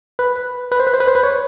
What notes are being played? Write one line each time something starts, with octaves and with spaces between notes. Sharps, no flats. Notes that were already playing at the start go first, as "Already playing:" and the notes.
B4
B4
C5
B4
C5
B4
C5
B4
C#5